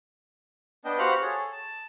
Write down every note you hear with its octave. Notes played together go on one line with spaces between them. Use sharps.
B3 D4 D#5 G5
F#4 G4 C5 F5 F#5 B5
G#4 A4 C#5
A5